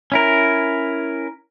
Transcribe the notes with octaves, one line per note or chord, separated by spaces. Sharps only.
C#4 E4 A#4